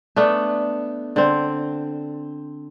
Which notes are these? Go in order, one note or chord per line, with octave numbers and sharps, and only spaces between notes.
A3 B3 D4
D3 C4